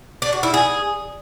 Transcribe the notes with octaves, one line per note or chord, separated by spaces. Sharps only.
D4
F#4
E4
G#4